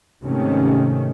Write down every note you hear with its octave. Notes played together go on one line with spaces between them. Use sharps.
G#2 C3 D#3 A3 C#4